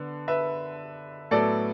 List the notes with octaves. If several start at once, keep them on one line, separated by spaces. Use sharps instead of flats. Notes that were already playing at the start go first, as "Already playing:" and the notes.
Already playing: D3 B3
B4 E5
A2 F#3 B3 A4 D5